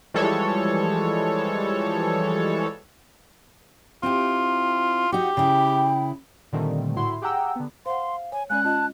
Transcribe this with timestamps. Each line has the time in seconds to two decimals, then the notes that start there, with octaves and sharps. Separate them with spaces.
0.14 E3 F3 G3 G#3 A4 C#5
4.03 C4 E4 F4 G4
5.12 D#4 F#4 G4
5.37 C#3 E4 G5
6.52 A#2 D3 D#3 G3 A3 C4
6.96 A2 E4 F#4 C6
7.22 G4 G#4 F#5 G5 A#5 E6
7.56 D3 B3
7.86 C5 F5 F#5 C6
8.32 C#5 G#5
8.50 G#3 C#4 D5 G#5 F#6
8.64 C#4 F4 D#5 A5